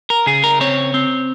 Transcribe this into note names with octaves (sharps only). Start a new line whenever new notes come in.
A#4
C#3 G#4
A#4
C4 C#5
C4